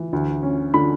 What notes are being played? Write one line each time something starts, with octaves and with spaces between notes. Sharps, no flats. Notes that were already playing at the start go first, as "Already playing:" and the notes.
Already playing: E3
D2
C#4
D3 B5